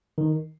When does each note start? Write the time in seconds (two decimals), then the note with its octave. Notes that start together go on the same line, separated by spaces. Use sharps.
0.18 D#3